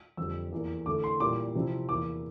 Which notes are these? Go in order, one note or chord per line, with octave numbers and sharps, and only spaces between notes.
F2 D3 G3 E6
E2 E3 A#3
D3 A3 E4 D6
C6
A#2 G3 A#3 E4 D6
C3 F3 C4 E4
E2 E3 A#3 E4 D6